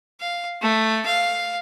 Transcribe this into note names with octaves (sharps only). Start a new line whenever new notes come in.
F5
A3
F5